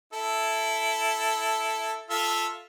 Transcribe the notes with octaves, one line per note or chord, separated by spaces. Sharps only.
E4 A4
F4 A4 E5